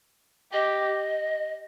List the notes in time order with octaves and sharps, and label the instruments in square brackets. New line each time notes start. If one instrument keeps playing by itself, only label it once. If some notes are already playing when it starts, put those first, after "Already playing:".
[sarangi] G4 [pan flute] D#5